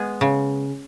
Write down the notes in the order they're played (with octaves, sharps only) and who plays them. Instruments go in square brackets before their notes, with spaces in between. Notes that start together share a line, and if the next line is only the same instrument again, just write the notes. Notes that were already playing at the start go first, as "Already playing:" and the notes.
Already playing: [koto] G#3 B3 G#4
C#3